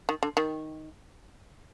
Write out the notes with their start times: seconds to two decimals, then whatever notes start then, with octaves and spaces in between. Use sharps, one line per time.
0.09 D#3
0.23 D3
0.37 D#3